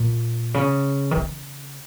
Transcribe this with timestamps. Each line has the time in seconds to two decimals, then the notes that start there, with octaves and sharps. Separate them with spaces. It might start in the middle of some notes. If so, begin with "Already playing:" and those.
Already playing: A#2
0.54 C#3
1.11 D#3
1.17 C#3